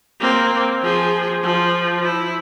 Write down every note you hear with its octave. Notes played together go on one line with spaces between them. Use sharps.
A#3 C4
F3 G#4
F3
E4